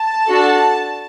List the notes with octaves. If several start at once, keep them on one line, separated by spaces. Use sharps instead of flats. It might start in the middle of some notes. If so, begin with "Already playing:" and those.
Already playing: A5
D4 F#4 A4